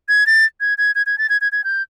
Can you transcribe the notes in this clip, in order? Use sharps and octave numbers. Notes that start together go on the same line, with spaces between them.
G#6
A6
G#6
G#6
G#6
G#6
A6
G#6
G#6
G#6
G6